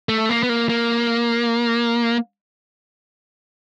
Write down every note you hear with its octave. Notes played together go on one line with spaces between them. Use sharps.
A3
A#3
B3
A#3
A#3